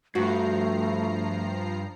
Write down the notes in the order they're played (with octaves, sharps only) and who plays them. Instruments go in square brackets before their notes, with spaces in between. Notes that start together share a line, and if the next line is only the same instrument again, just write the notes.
[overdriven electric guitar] G2 [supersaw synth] F3 A#5 C7 [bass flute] A3 [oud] F#4